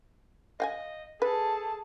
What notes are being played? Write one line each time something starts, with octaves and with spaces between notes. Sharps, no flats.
D#5 F5 G5 G#5
G#4 A4 B4 A5